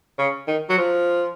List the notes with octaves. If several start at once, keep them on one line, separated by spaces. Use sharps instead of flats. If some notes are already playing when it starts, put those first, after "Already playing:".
C#3
D#3
F#3
F3